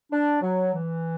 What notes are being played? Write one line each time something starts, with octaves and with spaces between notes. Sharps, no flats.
D4
F#3
E3